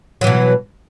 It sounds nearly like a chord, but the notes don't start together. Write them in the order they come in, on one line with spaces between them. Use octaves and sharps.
F#3 E3 B2